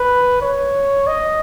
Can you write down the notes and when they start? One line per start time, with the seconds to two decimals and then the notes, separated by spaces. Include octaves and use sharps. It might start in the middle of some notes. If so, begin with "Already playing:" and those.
Already playing: B4
0.41 C#5
1.07 D#5